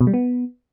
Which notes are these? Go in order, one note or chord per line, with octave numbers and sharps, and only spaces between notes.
B2
G3
B3